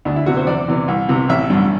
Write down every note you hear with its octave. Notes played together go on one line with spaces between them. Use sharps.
D2 D4
E4
C3 E3 F#4
C5
E2 D5
C3 E3
C2
C3 E3
A1 E5
G2 D3